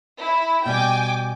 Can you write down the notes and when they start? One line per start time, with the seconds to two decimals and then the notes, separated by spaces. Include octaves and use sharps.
0.21 E4
0.66 B2 G3 G5 G#5 D6